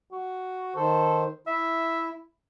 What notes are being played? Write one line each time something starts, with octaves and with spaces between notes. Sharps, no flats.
F#4
D#3 A4 C5
E4 E5